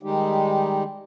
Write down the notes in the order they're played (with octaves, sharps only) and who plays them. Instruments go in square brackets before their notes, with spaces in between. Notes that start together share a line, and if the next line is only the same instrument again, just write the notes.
[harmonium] D#3 G3 G#3 D#4 G4